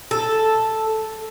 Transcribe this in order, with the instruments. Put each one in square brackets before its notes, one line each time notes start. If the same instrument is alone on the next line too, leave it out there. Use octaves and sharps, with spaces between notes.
[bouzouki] A4